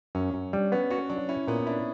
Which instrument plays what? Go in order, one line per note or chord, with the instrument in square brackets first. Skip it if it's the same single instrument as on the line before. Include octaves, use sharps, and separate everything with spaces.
[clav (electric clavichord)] F#2 [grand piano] C#4
[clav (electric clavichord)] F#2
[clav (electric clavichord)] G3 [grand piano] D4
[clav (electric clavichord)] B3 [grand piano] C#4
[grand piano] C#4 [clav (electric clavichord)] F#4
[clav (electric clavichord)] F#3 [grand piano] D4
[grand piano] C#4 [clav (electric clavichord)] E4
[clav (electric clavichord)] A#2 [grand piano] B3
[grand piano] D4 [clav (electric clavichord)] E4